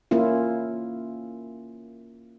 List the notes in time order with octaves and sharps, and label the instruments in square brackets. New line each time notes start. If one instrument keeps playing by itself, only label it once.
[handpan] A#3 C#4 E4 F4